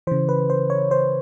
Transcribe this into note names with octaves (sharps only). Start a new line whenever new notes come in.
C#3 E3 C5
B4
C5
C#5
C5